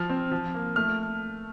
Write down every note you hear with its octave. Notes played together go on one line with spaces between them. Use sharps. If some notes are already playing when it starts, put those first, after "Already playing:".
Already playing: F3 F6
C4
F3
A#3
A3 F6